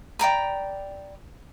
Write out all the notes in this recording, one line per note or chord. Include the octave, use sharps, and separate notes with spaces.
D5 G5 A#5 B5